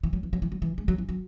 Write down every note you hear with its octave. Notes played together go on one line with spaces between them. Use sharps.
E3
F#3
E3
F#3
E3
F#3
E3
G#3
F#3
E3
F#3